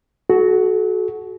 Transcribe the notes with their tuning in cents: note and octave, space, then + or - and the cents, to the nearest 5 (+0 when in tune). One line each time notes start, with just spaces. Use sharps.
F#4 +5 A4 -40